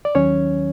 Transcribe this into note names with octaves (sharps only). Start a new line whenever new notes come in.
D5
D#2 D#3 F#3 C#4 C#5